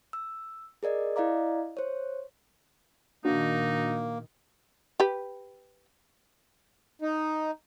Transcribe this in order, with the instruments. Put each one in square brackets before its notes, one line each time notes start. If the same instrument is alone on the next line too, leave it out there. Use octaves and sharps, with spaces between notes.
[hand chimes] E6
G#4 A#4 D5 D#5
E4 D5 D#5 F5 A#5 D6
C5 C#5
[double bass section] A#2 D#3 [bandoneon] A#3 [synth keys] D4 F#4 [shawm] D#4
[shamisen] G4 B4
[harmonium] D#4